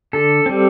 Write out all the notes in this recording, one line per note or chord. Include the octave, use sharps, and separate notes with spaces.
D3 A4
G3 C4